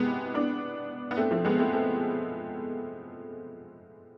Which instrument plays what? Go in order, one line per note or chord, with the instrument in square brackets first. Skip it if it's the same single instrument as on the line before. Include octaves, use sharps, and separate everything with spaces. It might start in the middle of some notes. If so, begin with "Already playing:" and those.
Already playing: [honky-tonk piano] C3 G#3 B3
B3 D4
B3
A3 C4
F3 A3
G#3 B3
A3 C4
A3 C4